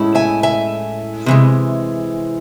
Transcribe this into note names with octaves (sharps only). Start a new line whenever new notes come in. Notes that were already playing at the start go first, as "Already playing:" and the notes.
Already playing: A2 G#3 C#4 E4
E5 G#5
E5 G#5
C3 E3 G#3